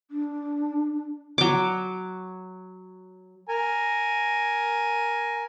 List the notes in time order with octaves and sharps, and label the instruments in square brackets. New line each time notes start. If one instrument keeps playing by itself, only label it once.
[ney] D4
[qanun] F#3 D6
[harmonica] A#4 G#5